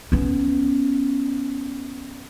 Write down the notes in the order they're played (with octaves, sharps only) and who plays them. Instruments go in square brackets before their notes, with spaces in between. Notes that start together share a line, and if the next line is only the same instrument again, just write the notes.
[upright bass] B3 C#4